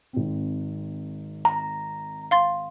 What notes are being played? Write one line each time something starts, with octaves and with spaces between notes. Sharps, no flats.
G#1 C4
A#5
F5 C6 A6